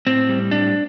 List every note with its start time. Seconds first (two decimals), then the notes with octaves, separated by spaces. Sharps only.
0.07 A2 C4
0.29 G3
0.51 A2 D4